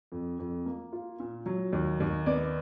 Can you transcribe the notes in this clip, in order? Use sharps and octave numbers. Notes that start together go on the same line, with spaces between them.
F2
F2
A#3
F4
A#2
F#3
D#2
D#2
B3 D5